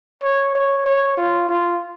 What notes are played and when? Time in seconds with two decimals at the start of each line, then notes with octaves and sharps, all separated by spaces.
0.23 C#5
0.55 C#5
0.86 C#5
1.17 F4
1.49 F4